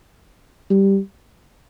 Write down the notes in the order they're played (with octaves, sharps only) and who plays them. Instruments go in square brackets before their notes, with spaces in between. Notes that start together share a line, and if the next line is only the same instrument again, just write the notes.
[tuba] G3